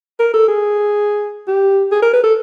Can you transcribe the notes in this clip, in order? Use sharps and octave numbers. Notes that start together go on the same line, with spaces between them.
A#4
A4
G#4
G4
G#4
A#4
B4
A4